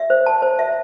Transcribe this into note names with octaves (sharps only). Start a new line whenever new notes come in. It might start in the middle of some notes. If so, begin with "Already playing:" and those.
Already playing: E5
C5
A5
C5
E5